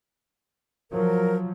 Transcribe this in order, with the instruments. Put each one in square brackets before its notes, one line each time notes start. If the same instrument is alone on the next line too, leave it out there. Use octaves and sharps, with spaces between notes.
[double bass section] F3 F#3 [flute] A#4